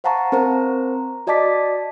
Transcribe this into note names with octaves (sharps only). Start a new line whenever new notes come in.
C5 F5 F#5 A5 A#5 C#6
C4 A#4 C5 A#5
F#4 D5 D#5 A5 D6 B6